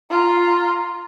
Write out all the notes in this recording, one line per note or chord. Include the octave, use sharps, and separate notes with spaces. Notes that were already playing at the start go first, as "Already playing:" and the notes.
F4 A#5